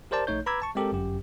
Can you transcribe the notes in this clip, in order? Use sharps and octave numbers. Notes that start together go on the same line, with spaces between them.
G4 A#4 C5 D5 A5
A#1 A3 D#4 C#5 G6
B4 A#5 B5 D6 E6 G#6
A5 C#6
G#3 C4 G4 A4 A#4
G1 F#2 G4